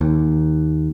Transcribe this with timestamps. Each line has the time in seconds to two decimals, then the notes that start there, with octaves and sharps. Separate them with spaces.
0.01 D#2